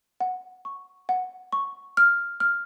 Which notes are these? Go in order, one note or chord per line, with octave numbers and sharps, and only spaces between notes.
F#5
C#6
F#5
C#6
F6
F6